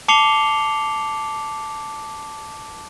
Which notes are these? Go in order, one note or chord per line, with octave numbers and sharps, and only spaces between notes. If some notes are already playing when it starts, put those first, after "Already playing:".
A5 D6 C7 C#7 F7 G7